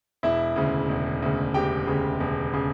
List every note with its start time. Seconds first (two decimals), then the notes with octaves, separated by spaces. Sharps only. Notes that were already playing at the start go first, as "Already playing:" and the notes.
0.23 E1 E4 E5
0.56 D2 C#3
0.89 E1
1.22 D2 C#3
1.54 E1 G4 G5
1.87 D2 C#3
2.20 E1
2.54 C#3